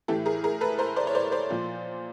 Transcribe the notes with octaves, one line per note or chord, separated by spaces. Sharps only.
A2 E3 G4 A4
G#4 A#4
G#4 A#4
A4 B4
A#4 C5
C5 D5
C#5
C5 D5
C5 D5
A#2 F3